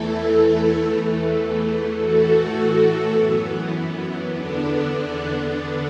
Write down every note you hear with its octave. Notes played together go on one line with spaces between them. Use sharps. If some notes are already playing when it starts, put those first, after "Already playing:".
Already playing: E2 E3 A3 E4 A4
E2 E3 A3
A2 E3 A3 F#4 A4
F#2 E3 B3
E2 D3 B3 D4
D3 B3 D4